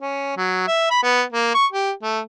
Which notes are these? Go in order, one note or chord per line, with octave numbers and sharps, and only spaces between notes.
C#4
F#3
E5
B5
B3
A#3
C#6
G4
A3